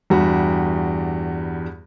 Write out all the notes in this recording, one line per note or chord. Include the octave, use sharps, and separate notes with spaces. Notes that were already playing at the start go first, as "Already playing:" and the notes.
E2 G2 G3 F#4